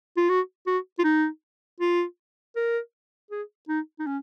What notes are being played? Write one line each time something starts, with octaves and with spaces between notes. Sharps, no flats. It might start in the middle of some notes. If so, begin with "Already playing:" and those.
F4
F#4
F#4
F4
D#4
F4
A#4
G#4
D#4
D#4
C#4